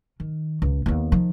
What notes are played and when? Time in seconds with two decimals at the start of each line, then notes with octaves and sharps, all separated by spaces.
0.20 D#3
0.62 C#2
0.86 D#2 B3
1.12 D#3 F3